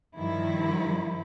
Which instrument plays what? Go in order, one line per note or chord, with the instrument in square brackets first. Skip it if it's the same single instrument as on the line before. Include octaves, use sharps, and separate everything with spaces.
[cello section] G2 D#3 F3 E4